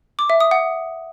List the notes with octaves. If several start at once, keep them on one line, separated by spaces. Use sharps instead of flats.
D6
E5
D#6
F#5